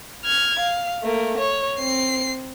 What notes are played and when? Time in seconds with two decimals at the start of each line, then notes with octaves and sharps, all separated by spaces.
0.25 F6 G#6
0.59 F5
1.02 A3 A#3
1.38 C#5
1.79 C4 C7